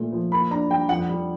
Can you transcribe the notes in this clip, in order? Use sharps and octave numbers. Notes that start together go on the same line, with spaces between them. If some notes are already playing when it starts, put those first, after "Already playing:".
Already playing: A#2 A3
F3
A#3 B5
D4 A#5
G3 G5
F2 F#5
G3